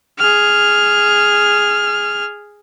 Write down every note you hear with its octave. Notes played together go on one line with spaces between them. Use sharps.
G#4 F6